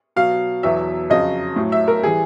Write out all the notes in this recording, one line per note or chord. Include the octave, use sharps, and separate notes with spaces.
B2 F#3 F5
E2 B2 F#3 E5
F2 C#3 F#3 D#5
A2 F#3
E5
A#4
E3 G3 G#4